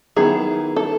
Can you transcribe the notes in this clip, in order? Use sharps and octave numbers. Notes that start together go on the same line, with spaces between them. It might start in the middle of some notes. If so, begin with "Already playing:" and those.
D#3 F#3 B3 E4 G#4
A4